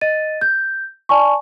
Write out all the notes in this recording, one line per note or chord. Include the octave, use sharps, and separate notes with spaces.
D#5 A6 D#7
G6
D5 G#5 A5 C#6